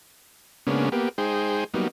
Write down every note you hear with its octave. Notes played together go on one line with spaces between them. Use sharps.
C#3 G#3 A#3 B3 C#4 D4
A#3 B3 G4
G#3 D#4 G#4 C5 G5
F#3 G3 A#3 B3 D#4